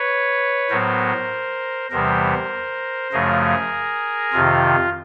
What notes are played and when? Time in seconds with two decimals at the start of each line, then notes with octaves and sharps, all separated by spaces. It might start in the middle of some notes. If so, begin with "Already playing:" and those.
Already playing: B4 C#5
0.70 A2 F#3 B3 A#4 C5
1.91 E2 C3 E3 G3 B3 A#4 C5
3.12 F#2 C#3 F3 A3 G#4 A#4
4.33 F2 C3 D#3 F4